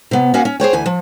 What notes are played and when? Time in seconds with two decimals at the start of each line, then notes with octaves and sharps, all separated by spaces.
0.11 C3 B3
0.34 A#3 C#4 F#4 D#5 F5 G#5
0.45 C#4
0.60 G#4 C5 C#5 G5
0.73 D2 E3 G#5
0.86 F3